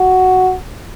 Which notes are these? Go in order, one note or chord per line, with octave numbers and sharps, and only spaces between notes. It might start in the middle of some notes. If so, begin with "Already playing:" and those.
Already playing: F#4